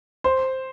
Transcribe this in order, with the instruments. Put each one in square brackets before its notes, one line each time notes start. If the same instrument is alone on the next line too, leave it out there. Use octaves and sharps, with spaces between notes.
[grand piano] C5